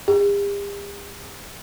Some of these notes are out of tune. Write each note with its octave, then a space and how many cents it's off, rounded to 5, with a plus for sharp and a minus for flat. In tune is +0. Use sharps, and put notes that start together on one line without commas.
G4 +45